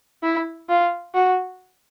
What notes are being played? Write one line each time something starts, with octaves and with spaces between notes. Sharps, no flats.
E4
F4
F#4